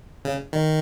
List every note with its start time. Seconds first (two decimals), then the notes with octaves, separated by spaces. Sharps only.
0.25 C#3
0.53 D#3